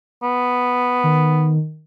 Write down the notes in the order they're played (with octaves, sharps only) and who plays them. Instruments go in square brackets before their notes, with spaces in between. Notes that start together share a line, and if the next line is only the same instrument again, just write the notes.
[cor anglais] B3
[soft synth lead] D#3